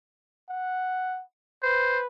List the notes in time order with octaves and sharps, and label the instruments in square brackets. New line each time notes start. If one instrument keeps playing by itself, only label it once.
[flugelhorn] F#5
[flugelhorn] B4 [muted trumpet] C5